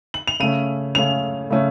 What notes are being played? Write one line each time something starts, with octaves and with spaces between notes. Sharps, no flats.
F#7
F7
C#3 A3 C#4 D#7
C#3 A3 C#4 F7
C#3 A3 C#4